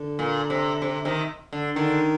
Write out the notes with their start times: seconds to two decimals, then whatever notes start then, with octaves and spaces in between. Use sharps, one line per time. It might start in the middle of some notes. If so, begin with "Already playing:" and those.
Already playing: D3
0.19 A#2
0.50 C3
0.82 C3
1.05 C3 D#3
1.53 D3
1.76 D3 D#3